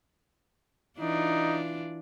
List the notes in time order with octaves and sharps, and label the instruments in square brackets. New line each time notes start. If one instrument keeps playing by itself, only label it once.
[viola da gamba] E3 D4 F4 [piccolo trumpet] D#4